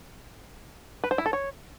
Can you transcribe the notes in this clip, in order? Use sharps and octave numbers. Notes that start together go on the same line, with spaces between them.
B4
C5
E4
A4
C#5